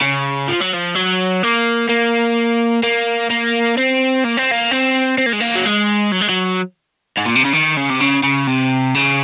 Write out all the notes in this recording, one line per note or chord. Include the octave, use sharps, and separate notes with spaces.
C#3
F3
F#3
F3
F#3
A#3
A#3
A#3
A#3
C4
A#3
C4
A#3
C4
C4
A#3
G#3
A#3
F#3
G#3
F#3
G#3
F#3
G#2
A#2
C3
C#3
D#3
C#3
C3
C#3
C#3
C3
C#3